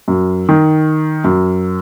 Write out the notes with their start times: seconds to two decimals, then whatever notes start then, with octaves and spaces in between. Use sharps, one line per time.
0.08 F#2
0.49 D#3
1.24 F#2